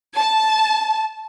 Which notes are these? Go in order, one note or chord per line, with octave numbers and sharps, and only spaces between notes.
A5